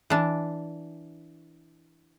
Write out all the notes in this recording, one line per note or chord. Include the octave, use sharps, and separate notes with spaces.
E3 D4